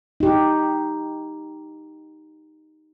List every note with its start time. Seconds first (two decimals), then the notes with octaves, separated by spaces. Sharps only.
0.20 D#4 G4